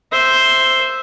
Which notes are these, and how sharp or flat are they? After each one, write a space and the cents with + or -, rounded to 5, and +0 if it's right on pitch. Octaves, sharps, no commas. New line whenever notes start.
C5 +0 E5 +0